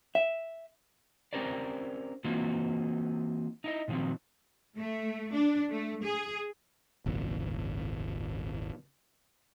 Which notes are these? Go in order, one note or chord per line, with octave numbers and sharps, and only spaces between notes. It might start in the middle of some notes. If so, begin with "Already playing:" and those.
E5
C4 C#4 G4 A#4 C5 D5
E3 A#3 C4 D#4 F4 F#4
D#4 E4 D#5
A#2 D#3 F3 F#3 C4
A3
D4
A3
G#4
D#1 G#1 F#2 C#3